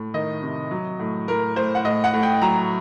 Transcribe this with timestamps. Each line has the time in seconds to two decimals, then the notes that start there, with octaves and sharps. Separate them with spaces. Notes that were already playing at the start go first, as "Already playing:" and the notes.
Already playing: A2
0.14 D#3 D#5
0.42 C3
0.71 F#3
1.00 A2
1.28 A2 A#4
1.56 A2 C5
1.75 F#5
1.85 A2 D#5
2.04 F#5
2.13 A2
2.23 G5
2.42 F#3 A#5